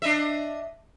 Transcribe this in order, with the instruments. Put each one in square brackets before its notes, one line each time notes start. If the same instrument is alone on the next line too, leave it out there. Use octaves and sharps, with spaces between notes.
[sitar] D4 D#5 E5